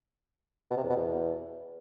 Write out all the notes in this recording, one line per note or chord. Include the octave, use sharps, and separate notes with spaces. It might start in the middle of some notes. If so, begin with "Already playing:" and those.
B2
C3
E2
B2
E2